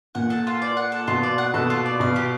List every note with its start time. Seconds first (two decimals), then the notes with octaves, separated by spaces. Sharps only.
0.15 A#2 F#5
0.30 A4
0.47 F4
0.62 D5
0.77 F#5
0.92 A4
1.08 B2 F4
1.23 D5
1.38 F#5
1.54 B2 A4
1.70 F4
1.86 D5
2.00 B2 F5
2.16 G4